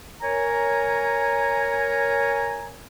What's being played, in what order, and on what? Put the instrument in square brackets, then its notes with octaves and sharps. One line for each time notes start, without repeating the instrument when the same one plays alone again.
[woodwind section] A#4 C#5 G#5 A#5